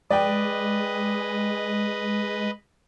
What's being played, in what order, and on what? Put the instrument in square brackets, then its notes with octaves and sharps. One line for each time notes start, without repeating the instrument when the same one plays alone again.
[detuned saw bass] G#3 [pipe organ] B4 D#5 [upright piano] D5 G5